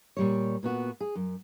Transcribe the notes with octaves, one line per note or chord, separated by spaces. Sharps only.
A#2 G3 C#5
A#2 B3 F#4
G#4
F#2